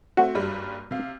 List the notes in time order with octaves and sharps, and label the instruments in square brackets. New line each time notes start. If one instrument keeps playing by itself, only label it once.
[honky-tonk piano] A3 C4 [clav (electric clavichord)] F#4
[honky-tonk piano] F#1 G2 G3
C3 F5